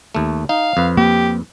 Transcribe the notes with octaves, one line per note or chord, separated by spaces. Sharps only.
D#2 A3
D#4 F5
F2 B4
A#3 G4